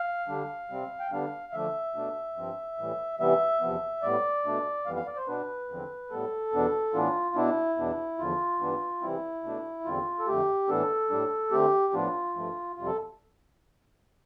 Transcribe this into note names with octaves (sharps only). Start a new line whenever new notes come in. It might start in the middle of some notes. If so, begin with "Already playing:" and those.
Already playing: F5
D3 G3 D4
C3 G3 C4
G5
D3 G3 B3 D4 F5
D3 F3 A3 D4 E5
B2 A3 D4
G2 F3 C4
A2 E3 G3
C3 E3 G3 B3 E5
E2 C3 F3 B3
A2 G3 B3 D5
B2 A3 D4
F2 E3 G3 B3 F5
F5
D5
C5
B2 B3 D4 B4
E2 D3 F3 C4
A2 G3 B3 A4
E2 B2 B3 D4
A2 E3 B3 D4 F4
B2 B3 D4 E4
E2 B2 B3 D4
E2 D3 F3 F4
G2 E3 B3 D4
C3 E3 G3 C4 E4
B2 A3 D4
E2 D3 G3 C4 F4
A4
F2 D3 A3 G4
A2 E3 B3 D4 A4
A2 G3 D4
D3 A3 C4 G4
A2 F3 B3 D4 F4
G2 F3 A3
F2 C3 G3 F4
A4